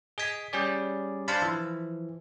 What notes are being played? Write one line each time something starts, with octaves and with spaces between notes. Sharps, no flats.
G#4 D#5 G#5 B6
G3 C#4 G#4 D5
D4 C5 F5 A5 B5
E3 F3